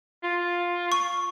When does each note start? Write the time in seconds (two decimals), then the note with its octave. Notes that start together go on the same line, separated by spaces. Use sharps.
0.23 F4
0.92 C#6